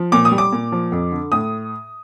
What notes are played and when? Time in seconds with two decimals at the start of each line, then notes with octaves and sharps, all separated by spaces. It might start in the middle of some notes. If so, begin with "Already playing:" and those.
Already playing: F3
0.12 A#2 D6
0.25 D#6
0.32 G3
0.38 D6
0.52 A#2
0.72 F3
0.92 F2
1.12 D3
1.32 A2 D#6